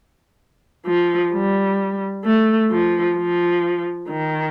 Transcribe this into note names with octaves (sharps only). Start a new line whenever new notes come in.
F3
G3
A3
F3
F3
D#3